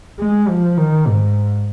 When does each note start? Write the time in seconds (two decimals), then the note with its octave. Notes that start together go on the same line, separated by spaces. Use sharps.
0.19 G#3
0.48 F3
0.77 D#3
1.07 G#2